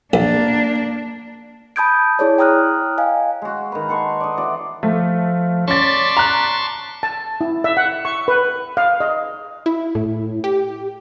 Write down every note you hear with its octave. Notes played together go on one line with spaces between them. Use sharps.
A#1 A#3 D4
A5 B5 D#6 G6 G#6 D7
E4 G#4 C#5 D5
G5 A#5 D#6 F6 F#6
D#5 F5 G#5
G#3 F#4
D#3 B4
A4 F#5 C6 C#6
D5 D#5
E3 F#4 D5
F3 A3
C#4 D5 A5 C6 C#6 A6 B6
A#5 F#6
A5
E4
E5
F#5
C#6
B4
F5
D#5
E4
A2
G4